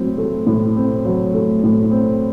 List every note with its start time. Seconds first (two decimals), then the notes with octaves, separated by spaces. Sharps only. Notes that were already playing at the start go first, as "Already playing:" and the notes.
Already playing: A2 F#3 C4
0.18 A3
0.47 A2
0.77 C4
1.05 F#3
1.35 A3
1.64 A2
1.91 C4